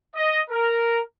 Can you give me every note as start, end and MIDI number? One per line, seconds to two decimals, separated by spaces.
0.15 0.40 75
0.50 1.00 70